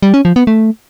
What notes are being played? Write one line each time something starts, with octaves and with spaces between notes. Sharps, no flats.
G3
C#4
F3
B3
A3